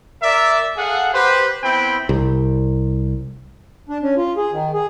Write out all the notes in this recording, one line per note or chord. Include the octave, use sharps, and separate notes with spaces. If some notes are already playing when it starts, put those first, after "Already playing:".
A#4 D5 E5
G#4 A4 F5 F#5
G4 B4 C5
B3 C4 E4 C5 G5 B5
C2
D4
C#4
F4
G#4
D#3
G#4